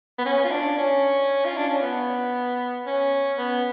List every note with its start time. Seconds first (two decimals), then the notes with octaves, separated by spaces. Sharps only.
0.18 B3
0.25 C#4
0.44 F4
0.51 D4
0.78 C#4
1.45 F4
1.57 D4
1.69 C#4
1.82 B3
2.86 C#4
3.38 B3